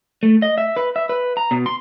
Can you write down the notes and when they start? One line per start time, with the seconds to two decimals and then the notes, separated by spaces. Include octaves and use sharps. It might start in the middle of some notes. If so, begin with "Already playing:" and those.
0.23 A3
0.42 D#5
0.58 E5
0.77 B4
0.96 E5
1.09 B4
1.37 A#5
1.51 B2
1.66 C6